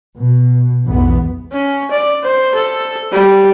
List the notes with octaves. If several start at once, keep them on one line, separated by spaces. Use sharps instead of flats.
B2
B1 F2 G#2 E3 B3
C#4
D5
C5
A4
G3